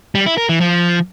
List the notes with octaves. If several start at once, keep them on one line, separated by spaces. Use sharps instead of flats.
G3
E4
A#4
E3
F3